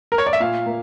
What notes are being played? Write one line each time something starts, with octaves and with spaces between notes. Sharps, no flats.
A#4
C#5
D5
E5
A#2 F5
A#3